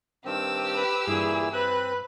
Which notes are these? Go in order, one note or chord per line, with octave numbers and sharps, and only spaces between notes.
G2 D#3 C4 G4 E6
B4
G2 A#2 E3 E4 G#4
C4 B4 F#6